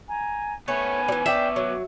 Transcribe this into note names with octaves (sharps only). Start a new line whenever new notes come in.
G#5 A#5
A3 B3 C#4 C#5 G#5 B5
E3 G3
D4 E5 G5 D6
F#3